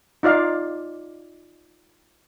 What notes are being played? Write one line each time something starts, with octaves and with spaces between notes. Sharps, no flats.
D#4 F4 D5 F5